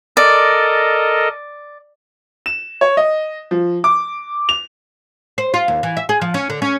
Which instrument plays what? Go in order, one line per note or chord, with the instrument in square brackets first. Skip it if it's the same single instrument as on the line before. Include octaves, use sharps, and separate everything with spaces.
[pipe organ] A4 A#4 D#5 [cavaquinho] D5
[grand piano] E7
C#5
D#5
F3
D6
F7
[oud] C5
F4
D#2
E3
E5
G#4
F3
C#4
D3
C#4